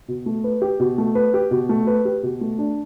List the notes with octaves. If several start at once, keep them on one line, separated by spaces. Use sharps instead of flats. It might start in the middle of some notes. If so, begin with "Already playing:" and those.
B2
A3
B4
G4
B2
A3
B4
G4
B2
A3
B4
G4
B2
A3
D4